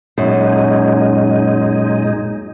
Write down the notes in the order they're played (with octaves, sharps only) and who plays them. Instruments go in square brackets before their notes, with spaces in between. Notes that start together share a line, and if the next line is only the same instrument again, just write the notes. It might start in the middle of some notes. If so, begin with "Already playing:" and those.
[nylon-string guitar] F#2 [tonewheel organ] A#2 G#3 D#4